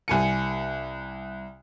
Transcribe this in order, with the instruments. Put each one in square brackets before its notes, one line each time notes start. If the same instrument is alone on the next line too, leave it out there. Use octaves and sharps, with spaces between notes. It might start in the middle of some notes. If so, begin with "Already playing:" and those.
[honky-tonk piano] C2 G#5 C#7